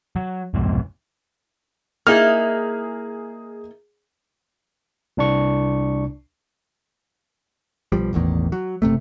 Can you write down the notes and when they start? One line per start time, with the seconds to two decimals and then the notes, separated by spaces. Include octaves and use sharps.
0.16 F#3
0.54 C2 F2 G#2 B2
2.07 A#3 D#4 E4 G#4 F6
5.17 C2 D4 C#6
7.92 B1 F3 G3
8.13 E1 A1 E2 D#3
8.52 F#3
8.82 F#1 C3 A3